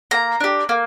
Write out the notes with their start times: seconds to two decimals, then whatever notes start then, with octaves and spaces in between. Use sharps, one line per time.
0.11 A#3 A#5
0.40 D4 G4
0.69 A#3